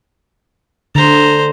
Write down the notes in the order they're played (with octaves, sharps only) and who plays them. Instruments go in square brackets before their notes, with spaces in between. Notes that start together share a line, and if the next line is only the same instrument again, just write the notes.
[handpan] D3 [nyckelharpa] C5 A#5